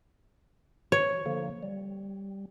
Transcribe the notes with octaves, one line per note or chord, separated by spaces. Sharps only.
C#5
D3 F3 A#3
G3